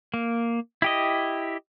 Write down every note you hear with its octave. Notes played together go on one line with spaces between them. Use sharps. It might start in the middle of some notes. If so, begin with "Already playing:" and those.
A#3
E4 G4 D#5